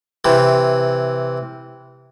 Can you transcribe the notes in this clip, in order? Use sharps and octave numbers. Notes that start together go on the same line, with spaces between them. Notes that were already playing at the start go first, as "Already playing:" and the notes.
C3 E3